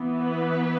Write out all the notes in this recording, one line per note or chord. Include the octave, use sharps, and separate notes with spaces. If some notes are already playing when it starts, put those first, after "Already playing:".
Already playing: E3 B3
B4